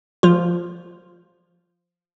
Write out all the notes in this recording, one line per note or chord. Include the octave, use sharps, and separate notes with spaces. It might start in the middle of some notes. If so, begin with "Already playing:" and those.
F3 F4